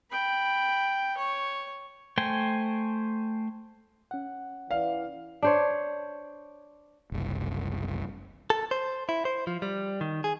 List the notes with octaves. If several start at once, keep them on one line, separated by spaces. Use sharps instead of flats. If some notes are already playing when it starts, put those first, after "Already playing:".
G5 B5
C#5
A3 C5 G5 G#5
C#4 F#5
E3 D5 F5
D4 C5 C#5
F#1 C2
A4
C5
E4
C5
F3
G3
D#3
G#4